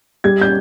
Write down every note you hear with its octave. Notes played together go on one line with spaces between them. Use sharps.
G3 G#6
G6